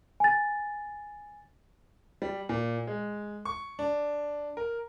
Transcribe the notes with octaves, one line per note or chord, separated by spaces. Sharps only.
G#5 A6
G3
A#2
G#3
C#6
D4
A#4